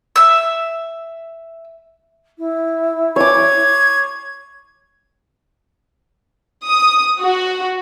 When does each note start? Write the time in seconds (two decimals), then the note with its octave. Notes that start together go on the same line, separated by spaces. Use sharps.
0.16 E5 E6
2.38 E4
3.16 C#5 D6 G#6
6.65 D#6
7.20 F#4